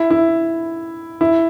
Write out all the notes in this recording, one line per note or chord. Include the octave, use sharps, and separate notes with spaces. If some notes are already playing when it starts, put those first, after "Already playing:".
Already playing: E4
E4
E4